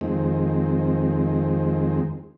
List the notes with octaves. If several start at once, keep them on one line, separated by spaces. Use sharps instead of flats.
F2 D#3 G#3 C4